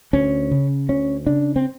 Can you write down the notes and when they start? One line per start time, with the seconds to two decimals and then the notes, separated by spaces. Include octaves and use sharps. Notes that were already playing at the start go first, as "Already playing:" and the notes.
0.13 D2 C#4
0.51 C#3
0.89 D2 C#4
1.26 C#3 D4
1.56 C4